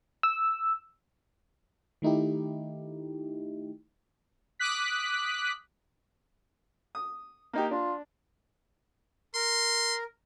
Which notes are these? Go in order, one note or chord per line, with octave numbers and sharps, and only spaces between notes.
E6
D#3 A3 D#4 E4 G4
D6 D#6 F#6 B6
D#6
A#3 D#4 G4
D4 F4
A#4 C6